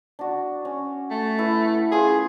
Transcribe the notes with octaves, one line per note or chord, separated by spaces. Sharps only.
D4 F#4
C#4
A3
E4 B4
C#4 F4 G#4 B4